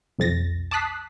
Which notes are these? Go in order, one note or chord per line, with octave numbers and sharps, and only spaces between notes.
B1 F2 A6 A#6
A5 D6 D#6 F#6 B6 C7